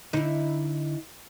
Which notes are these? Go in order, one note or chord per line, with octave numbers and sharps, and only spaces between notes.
D3 D#4 E4